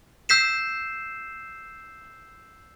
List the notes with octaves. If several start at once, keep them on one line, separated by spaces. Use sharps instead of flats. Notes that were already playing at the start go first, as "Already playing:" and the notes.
E6 G6 B6 C7 E7